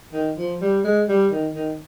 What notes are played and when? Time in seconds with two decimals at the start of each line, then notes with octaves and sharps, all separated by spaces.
0.13 D#3
0.37 F3
0.61 G3
0.85 G#3
1.09 G3
1.32 D#3
1.55 D#3